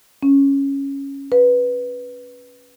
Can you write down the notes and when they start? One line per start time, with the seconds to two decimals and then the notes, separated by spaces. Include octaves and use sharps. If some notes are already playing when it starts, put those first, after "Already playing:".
0.23 C#4
1.32 B4